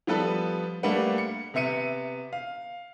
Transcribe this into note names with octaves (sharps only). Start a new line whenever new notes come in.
F3 G3 B3 A4 B4
G3 A3 A#3 D4 B4 F#5
C#7
C3 B3 E5 C#7 D#7
F5